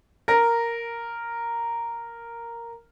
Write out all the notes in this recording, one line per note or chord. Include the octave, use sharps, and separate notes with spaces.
A#4 A#6